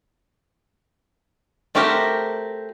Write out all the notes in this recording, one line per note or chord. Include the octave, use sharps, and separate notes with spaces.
A3 C4 F#4 G4 A#4